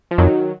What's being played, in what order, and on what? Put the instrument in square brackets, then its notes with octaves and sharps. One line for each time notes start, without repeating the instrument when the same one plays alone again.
[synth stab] F3
[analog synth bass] F2 [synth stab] D#3 F#3